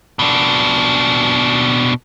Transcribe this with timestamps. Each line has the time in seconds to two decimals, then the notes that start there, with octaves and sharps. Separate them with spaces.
0.19 B2 D4